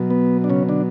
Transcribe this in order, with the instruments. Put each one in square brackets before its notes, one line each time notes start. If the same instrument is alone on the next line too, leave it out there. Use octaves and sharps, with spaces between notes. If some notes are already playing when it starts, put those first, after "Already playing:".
Already playing: [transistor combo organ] B2 F#3
B3
D4
C#3 C#4
D3 D4